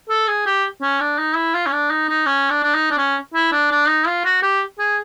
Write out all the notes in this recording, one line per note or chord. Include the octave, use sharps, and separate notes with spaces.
A4
G#4
G4
C#4
D4
D#4
E4
F4
C#4
D4
D#4
D#4
C#4
D4
D4
D#4
D4
C#4
E4
D4
D4
D#4
F4
F#4
G4
G#4